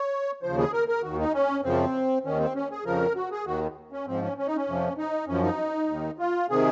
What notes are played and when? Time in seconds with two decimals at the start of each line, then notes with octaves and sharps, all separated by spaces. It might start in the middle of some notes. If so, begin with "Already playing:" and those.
Already playing: C#5
0.43 D#2 C#3 F3 C5
0.58 G#4
0.73 A#4
0.88 A#4
1.03 D#2 D#3 F#4
1.19 D#4
1.34 C#4
1.64 F#2 C#3 F3 C4
2.25 D#2 D#3 C#4
2.40 C4
2.55 C#4
2.71 G#4
2.85 F2 C#3 F3 A#4
3.16 F#4
3.31 G#4
3.46 D#2 D#3 F#4
3.92 C#4
4.07 G#2 F3 C4
4.22 C#4
4.38 C#4
4.47 D#4
4.56 C#4
4.68 F2 C3 F3
4.98 D#4
5.28 F#2 F3 C#4
5.43 D#4
5.89 D#2 D#3
6.19 F4
6.50 C3 D#3 G#4